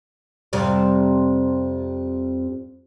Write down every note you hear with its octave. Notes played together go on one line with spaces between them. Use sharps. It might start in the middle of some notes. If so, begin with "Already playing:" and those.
F2 C3 G3